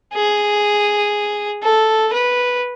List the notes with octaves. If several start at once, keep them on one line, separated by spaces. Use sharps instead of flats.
G#4
A4
B4